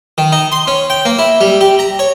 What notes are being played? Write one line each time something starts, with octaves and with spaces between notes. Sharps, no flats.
D#3
D#4
C6
C#4
G5
A#3
E4
G3
G4
A#5
C#5